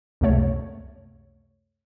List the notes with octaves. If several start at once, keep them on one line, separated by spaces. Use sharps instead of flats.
C#2 F#2 C3 A3 C#5